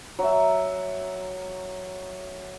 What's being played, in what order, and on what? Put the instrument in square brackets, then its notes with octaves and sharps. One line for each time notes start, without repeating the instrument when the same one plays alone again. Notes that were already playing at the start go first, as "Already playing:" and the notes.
[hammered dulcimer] F#3 E5